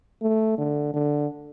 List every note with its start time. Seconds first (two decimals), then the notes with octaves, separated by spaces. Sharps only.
0.21 A3
0.58 D3
0.94 D3